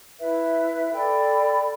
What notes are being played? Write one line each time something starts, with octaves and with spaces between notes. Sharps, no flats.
E4 B4 E5
A4 D5 G5 B5